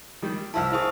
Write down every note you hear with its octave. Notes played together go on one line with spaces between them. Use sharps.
D#3 G3
C2 F3 E4 A5 E6 F6
E4 F4 G#4 C5 C#6 D#6